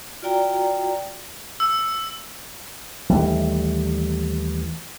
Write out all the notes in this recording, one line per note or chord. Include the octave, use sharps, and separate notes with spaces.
F4 F#4 D5 G5 A#5
E6
D#2 E3 G3 A3